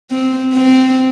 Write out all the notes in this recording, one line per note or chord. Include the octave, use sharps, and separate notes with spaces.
C4
C4